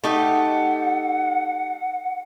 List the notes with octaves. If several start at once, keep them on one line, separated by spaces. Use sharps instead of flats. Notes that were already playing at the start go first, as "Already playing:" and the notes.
A3 D#4 G4 F#5